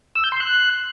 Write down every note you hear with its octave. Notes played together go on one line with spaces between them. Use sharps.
E6
G6
C6
F#6